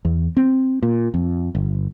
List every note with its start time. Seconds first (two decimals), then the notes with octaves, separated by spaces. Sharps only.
0.05 E2
0.37 C4
0.83 A#2
1.14 F2
1.55 G1